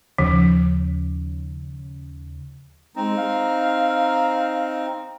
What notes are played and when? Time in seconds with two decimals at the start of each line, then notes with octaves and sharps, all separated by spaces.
0.18 D#2 C#3 F3
2.96 G#3 C4 D#4
3.17 F5